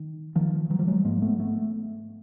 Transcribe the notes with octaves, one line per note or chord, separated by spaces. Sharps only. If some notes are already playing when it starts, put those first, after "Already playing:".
Already playing: D#3
D#3 F3
E3 F#3
F3 G3
F#3 G#3
G#2 G#3 A#3
A3 B3
A3 B3